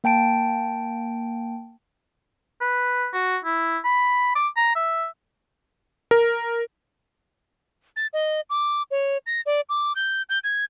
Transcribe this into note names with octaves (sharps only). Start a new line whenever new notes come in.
A#3 G5 A5 D7
B4
F#4
E4
B5
D6
A#5
E5
A#4
A6
D#5
D6
C#5
A#6
D5
D6
G6
G6
G#6